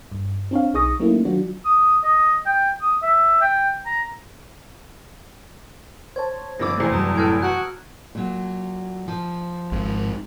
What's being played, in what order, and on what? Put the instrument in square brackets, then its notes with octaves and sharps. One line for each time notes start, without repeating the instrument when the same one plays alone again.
[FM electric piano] G2
C4 D4 C#5 F5
B1 D#4 G#4 C#6 D#6 A#6
F#3 A3 A#3 C#4 D#4 E4
D#3 F#3 D4 F4 F#4
[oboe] D#6
D#5
G5
D#6
E5
G5
A#5
[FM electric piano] C5 C#5 A5 [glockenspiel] G#6
[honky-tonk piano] G1 F3 D6 [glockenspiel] E6 A#6
[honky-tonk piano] F1 E2 [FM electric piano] A3 C5 C7
[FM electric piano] F#2 F#3 G3 [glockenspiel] A5 A#5 D#6
[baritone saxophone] A2 [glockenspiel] F6 G#6 D7
[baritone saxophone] F#4 [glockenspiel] F#6
[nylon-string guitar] A#2 F#3
F3
[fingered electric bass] G#1 G#2